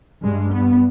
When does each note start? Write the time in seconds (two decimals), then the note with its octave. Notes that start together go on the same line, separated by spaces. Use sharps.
0.24 G2 G#3
0.53 B3